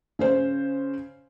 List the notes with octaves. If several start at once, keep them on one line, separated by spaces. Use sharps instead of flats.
C#3 C#4 C5